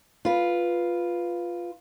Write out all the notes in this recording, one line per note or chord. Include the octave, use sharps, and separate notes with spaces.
F4 B4